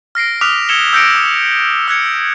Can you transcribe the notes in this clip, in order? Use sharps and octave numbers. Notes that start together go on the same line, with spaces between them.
F6 A#6 C7 D7
D6 D#6 F6 F#6 B6 F7
E6 G#6 C#7 E7 F7 G7
E6 G6 A#6 C#7 D7
D#6
E6 F#6 G#6 C#7